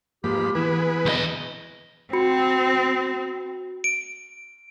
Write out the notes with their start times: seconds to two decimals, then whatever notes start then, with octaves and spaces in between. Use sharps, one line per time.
0.24 G#2 F3 A#3 G4 B5
0.55 E3 B3 E4 G#4 B4
1.06 E2 D#5
2.13 C4 F#4 B5 C#7
3.84 D7